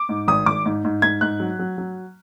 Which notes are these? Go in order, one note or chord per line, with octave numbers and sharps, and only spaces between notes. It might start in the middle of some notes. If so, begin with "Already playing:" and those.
Already playing: D6
G#2
G#1 D#6
G#1 D6
G#2
G#2
G#2 G#6
G#2 F#6
F#3
F#3
F#3